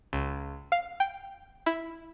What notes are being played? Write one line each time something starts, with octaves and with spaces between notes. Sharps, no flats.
C#2
F5
G5
E4